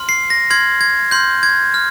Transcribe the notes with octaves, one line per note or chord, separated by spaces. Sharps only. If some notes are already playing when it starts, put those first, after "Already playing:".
Already playing: C6 F6
C7
A#6
C6 F6 G#6
G#6
C6 F6 G6
G#6
F6